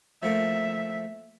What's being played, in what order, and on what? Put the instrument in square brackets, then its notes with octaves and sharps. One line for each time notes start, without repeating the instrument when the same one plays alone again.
[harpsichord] F3 A3 A#3 [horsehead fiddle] E5